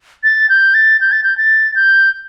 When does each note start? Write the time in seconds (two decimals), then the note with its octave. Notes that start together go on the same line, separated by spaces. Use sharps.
0.24 A6
0.49 G6
0.74 A6
1.01 G6
1.12 A6
1.24 G6
1.37 A6
1.75 G6